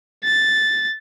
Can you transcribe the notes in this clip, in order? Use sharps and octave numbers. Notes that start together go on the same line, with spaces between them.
A6